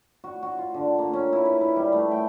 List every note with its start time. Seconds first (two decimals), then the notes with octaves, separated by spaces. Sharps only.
0.24 F#4
0.43 F#4
0.59 F4
0.74 D3
0.99 A#3
1.13 C#4
1.33 E4
1.45 B4
1.61 E4
1.76 G3
1.92 A3
2.11 G5